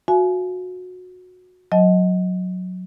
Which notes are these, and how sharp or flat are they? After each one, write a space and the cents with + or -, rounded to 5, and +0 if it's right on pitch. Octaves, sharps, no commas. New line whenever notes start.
F#4 -20 F5 -40 G#5 +35
F#3 -15 D#5 +15 A5 -30